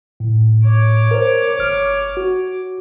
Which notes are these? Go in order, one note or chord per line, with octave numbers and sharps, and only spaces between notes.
A2
C#5 D6
A#4 C5
G1 F6
F#4